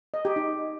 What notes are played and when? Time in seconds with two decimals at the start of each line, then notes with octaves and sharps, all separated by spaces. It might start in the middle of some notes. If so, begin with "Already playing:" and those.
0.14 D#5
0.25 G4
0.36 D#4